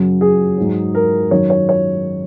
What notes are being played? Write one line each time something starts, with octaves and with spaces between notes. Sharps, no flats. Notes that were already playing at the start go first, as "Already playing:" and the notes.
Already playing: F#2 C#3 F#3
G#4
G#2 F#3
A#4
F#2 D#3 F#3 C#5
C#5
C#5